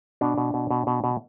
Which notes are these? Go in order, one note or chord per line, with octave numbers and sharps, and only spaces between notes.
B2 D4
B2
B2
B2
B2
B2